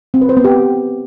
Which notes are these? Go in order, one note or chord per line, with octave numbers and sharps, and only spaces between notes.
C4
B4
C5
B3
G4